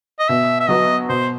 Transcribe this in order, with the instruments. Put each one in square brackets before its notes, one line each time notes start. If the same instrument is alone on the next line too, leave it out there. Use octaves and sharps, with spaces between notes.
[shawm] D#5
[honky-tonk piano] B2 [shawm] E5
[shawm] E5
[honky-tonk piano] F#3 B3 F#4 [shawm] D#5
[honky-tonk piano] B2 [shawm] C5